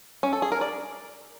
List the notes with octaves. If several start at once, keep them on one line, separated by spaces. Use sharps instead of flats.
C#4
A4
G#4
A#4
D5